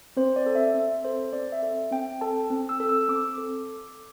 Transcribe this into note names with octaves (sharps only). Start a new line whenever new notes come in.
C4 C5
D5
A4
E5
C4
A4 C5
C4 D5
E5
A4
C4 G5
A4 A5
C4
E6
A4
E6
C4 D6
A4